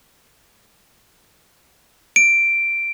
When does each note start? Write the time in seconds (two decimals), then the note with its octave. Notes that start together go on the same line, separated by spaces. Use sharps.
2.16 D7